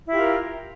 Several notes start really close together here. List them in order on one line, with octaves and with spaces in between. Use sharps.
E4 G4 F4 A#4